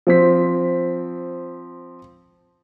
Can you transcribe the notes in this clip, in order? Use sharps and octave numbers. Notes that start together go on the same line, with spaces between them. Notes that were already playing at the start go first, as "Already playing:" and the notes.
F3 C4 B6